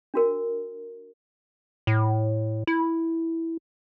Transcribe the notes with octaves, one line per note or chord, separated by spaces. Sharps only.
D4 F#4 A#4
A2
E4